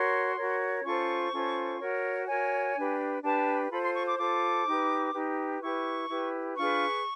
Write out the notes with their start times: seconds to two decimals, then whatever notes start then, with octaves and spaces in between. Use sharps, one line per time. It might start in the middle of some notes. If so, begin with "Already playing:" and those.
Already playing: F#4 A#4 C#5 C6
0.36 F#4 A#4 C#5
0.84 C#4 F4 A4 C5 C#6
1.32 C#4 F4 A4 C5
1.79 F#4 A#4 C#5
2.27 F#4 A#4 C#5 G#5
2.75 D4 G4 B4
3.23 D4 G4 B4 A5
3.70 F4 A4 C5 B5
3.83 C6
3.94 C#6
4.07 D6
4.18 F4 A4 C5 D6
4.67 D#4 G4 B4
5.14 D#4 G4 B4
5.62 E4 G4 B4 C#6
6.09 E4 G4 B4
6.57 D4 F4 G#4 B4 C#6